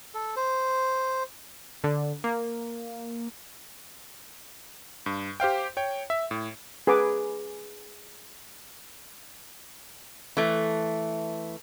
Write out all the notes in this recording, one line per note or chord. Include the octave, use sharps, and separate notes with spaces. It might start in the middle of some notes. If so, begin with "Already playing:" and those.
A4
C5
D3
A#3
G2
G4 C5 F5 G5
C#5 G5
E5
A2
G#4 B4 F#5 G#5 B5 D6
E3 A3